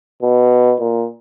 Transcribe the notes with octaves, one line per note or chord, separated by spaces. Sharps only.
B2
A#2